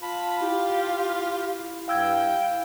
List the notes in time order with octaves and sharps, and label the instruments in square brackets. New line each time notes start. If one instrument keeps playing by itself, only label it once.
[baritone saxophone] F4 [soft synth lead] A5 [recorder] B5
[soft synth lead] E4 [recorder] G4
[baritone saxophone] G2 [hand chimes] F5 E6 G#6 [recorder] G5